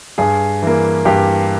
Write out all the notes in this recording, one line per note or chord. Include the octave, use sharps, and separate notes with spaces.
G2 G#4
E3 A#3
G2 G4